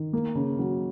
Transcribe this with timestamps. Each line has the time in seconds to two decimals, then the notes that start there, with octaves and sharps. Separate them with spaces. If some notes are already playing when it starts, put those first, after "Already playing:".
Already playing: D#3
0.13 A#3
0.35 C#3
0.59 F#3